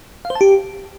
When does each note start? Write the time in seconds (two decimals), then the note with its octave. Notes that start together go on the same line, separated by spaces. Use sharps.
0.25 F5
0.30 C5
0.35 A5
0.41 G4